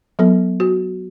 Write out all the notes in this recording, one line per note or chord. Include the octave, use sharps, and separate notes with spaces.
F#3 B3 A4
F#4